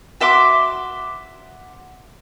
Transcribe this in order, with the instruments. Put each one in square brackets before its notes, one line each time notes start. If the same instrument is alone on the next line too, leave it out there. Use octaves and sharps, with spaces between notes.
[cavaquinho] F#4 E5 C6 D6